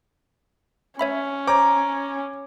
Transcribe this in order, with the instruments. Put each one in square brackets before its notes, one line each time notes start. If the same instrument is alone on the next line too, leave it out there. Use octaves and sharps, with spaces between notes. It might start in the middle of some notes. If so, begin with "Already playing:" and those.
[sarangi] C#4 [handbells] C#5 E5 B5
[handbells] C5 C#5 [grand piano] A#5 [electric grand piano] D6